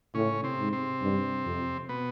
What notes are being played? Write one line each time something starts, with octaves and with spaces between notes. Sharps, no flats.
A2 C#3 C#4
C3 C4
G#2
C3 C4
G2
F2
B2 B3